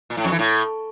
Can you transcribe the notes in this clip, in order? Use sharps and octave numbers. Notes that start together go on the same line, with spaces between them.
A#2
A2
F2
E3
A2